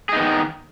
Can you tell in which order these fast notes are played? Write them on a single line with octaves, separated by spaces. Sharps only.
G#4 D#4 B3 D#3